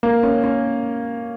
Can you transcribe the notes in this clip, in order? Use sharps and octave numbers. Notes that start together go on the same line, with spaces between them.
A#3
C#4
C#4